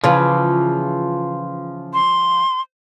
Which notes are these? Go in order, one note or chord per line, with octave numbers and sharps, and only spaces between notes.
C#3 E3 F3 F4
C6